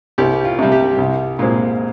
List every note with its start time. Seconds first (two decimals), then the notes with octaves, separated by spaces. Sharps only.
0.18 C2 G4
0.45 F4
0.59 C3 G3
0.72 G4
0.98 C2
1.39 A#2 G#3 C4